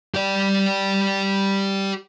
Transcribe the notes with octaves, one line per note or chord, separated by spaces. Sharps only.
G4 D5